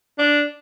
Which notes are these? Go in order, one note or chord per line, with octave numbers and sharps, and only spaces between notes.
D4